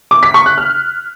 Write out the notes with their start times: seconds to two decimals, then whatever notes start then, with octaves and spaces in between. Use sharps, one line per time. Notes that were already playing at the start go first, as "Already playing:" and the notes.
0.11 D6
0.23 B6
0.34 C#6
0.46 F#6
0.58 F6